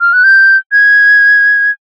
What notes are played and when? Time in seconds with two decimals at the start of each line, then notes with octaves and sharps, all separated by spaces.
0.01 F6
0.13 F#6
0.24 G6
0.72 G#6